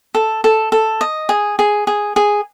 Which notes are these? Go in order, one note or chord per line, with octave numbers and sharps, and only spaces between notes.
A4
A4
A4
D#5
G#4
G#4
G#4
G#4